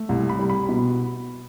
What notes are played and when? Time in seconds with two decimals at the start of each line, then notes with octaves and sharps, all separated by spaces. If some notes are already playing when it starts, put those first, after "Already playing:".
Already playing: A3
0.09 C2
0.29 B5
0.39 G3
0.50 B5
0.69 B2